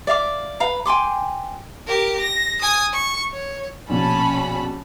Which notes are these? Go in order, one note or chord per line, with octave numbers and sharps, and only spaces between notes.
D5 E5 F5 D6
B4 F5 A#5
G5 G#5 C6 D6
G4 A#4
A#6
G#5 D#6
C#6
C#5
A#1 B2 C#4 A5 B5